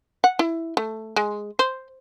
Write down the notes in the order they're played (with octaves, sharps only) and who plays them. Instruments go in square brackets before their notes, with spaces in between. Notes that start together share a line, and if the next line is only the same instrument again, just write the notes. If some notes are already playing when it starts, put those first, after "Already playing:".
[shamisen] F#5
E4
A3
G#3
C5